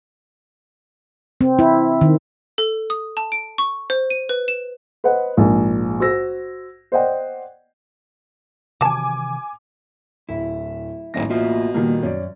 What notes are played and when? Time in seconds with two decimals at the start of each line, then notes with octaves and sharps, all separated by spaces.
1.41 C4
1.59 E4
2.01 D#3
2.58 A4
2.90 D#6
3.17 A5
3.32 D7
3.58 C#6
3.90 C5
4.10 D#7
4.29 B4
4.48 E7
5.04 B4 C5 D#5 F#5
5.37 A#1 G#2
6.00 F#4 C5 E6 A#6
6.92 C5 D5 D#5 F#5 G5
8.81 C3 D#3 E3 F#3 G#5 A5 D6
10.29 D1 E4
11.14 D#1 A1 A#6
11.30 B2 A#3 F4 E5
11.74 A#2 D#3 G3 A#3
12.03 F#2 C#4 D5